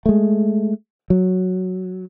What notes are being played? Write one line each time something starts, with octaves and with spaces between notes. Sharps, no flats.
G#3 A3
F#3